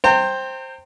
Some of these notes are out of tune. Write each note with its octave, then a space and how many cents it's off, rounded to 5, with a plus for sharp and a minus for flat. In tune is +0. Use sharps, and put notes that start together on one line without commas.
C5 +10 G5 +0 A#5 -40